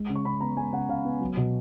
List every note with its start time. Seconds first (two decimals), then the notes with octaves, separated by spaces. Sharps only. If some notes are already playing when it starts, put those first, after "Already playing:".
Already playing: G#3
0.09 C#3
0.16 C#6
0.25 C#3 B5
0.40 B3 A#5
0.57 G#3 G#5
0.73 C#3 F#5
0.89 C#3 F5
1.05 B3
1.20 F#3
1.37 B2